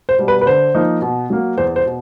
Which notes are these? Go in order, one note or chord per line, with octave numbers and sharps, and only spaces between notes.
C5
B2 G3
B4
B4
D3 C5
F3 A#3 D#4
B2
F#3 A#3
E2 C5
C5
B2